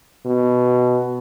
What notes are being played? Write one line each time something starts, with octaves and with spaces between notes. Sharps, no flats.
B2